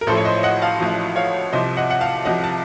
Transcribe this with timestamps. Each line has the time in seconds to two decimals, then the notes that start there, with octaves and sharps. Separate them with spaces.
0.01 A#4
0.07 A1 A2 F3 A4 C5
0.17 C#5
0.25 C5 D#5
0.43 D#5 F#5
0.62 F5 A5
0.80 A1 A2 F3
1.16 C#5 F5
1.53 C2 C3 F3 C5 D#5
1.77 D#5 F#5
1.90 F#5
2.01 F5 A5
2.25 C2 C3 F3 D#5 F#5
2.44 A5